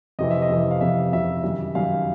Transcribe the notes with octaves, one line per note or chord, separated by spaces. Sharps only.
F2 C3 E3 D#5
E5
D#5
F2 C3 E3
F5
F2 C3 E3 E5
F2 C3 E3 E5
F#2 D#3 G3
F#2 D#3 G3 F5